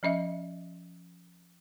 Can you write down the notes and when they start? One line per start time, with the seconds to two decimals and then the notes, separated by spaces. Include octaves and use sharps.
0.03 F3 C#4 D#5 E5